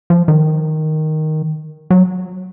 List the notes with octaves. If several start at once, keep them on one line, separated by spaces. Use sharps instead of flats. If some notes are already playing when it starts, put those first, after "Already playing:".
F3
D#3
F#3